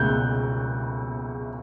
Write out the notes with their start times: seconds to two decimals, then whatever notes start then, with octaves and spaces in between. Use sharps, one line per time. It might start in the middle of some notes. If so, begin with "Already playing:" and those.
Already playing: C#2 B2 F#6 G6